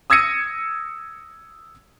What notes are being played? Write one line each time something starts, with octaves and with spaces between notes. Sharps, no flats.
D#6 E6 G#6 A#6 C#7 D#7